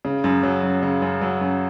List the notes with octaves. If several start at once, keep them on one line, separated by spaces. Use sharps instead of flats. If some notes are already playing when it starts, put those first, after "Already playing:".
C#3
F#2
F#3
F#2
C#3
F#2
F#3
F#2